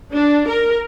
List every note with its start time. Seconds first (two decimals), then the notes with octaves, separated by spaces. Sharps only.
0.14 D4
0.49 A#4